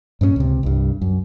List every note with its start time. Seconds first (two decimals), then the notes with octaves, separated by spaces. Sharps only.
0.21 G2 A#2 B3 C#4
0.36 C#2 C3
0.63 C2 G2
1.01 F#2